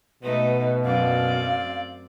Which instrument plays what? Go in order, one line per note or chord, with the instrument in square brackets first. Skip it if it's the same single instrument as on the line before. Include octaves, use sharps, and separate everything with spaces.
[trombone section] B2 [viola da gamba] A3 D#4 [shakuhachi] B4
[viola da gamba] F#2 [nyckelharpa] C4 D5 [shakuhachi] F5